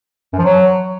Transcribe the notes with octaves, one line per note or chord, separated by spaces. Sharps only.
F#2
F3
F#3